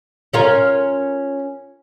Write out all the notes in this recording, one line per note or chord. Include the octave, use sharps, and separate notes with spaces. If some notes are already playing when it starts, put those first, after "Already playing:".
C#4 F4 A#4